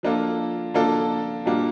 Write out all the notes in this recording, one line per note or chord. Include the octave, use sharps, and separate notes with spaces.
F3 A#3 D4 F4 A4
F3 A#3 D4 F4 A4
A#2 G3 A#3 D4